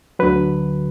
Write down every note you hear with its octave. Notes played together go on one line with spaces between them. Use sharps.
D2 D3 F#3 B4